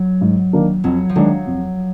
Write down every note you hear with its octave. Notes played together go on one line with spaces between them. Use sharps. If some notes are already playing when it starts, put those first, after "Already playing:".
Already playing: F#3
G#2
D#3 A#3 D4
F2 F#3
F3
D#3 F#3 G#3 D4
F2